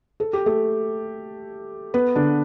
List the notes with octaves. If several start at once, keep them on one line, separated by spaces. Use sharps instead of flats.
A4
G4
A3 A4
B3 B4
D3 D4